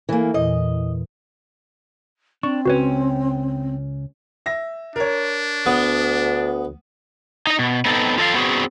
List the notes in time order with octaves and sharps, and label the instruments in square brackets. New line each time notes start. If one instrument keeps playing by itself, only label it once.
[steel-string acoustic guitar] E3 A#3 [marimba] A4 B4 G#5
[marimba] E2 A#2 E3 [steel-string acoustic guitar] D#5
[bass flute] C4 [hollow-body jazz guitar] D4 [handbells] C#6
[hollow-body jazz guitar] C#2 C#4 [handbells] F#4 B4 C#5
[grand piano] E5 A#6
[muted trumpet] D4 [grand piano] A#4 C#5
[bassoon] D2 [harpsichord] B3 [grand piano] D#6
[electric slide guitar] D#4 D#5
B2
B3 C4 D#4 A4
F4 A4 D#5 F5
B3 C4 F#4 G#4